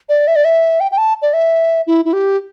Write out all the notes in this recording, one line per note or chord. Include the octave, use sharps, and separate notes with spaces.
D5
E5
D5
E5
G5
G5
A5
D5
E5
E4
E4
G4